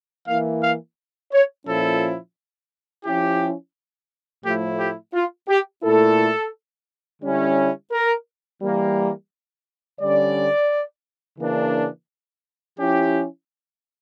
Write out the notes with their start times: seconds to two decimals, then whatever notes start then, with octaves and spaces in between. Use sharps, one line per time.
0.27 E3 A#3 E4 F5
0.63 F5
1.33 C#5
1.66 A#2 F3 C#4 E4 A4
3.05 F3 C#4 E4 G4
4.44 A2 F3 A3 E4 G4
4.80 G4
5.14 F4
5.48 G4
5.83 A#2 A3 E4 A4
7.22 D3 G3 C#4 E4
7.92 A#4
8.62 E3 G3 A#3
10.00 D3 G3 C#4 D5
11.39 C#3 E3 A#3 D4
12.78 F3 C#4 E4 G4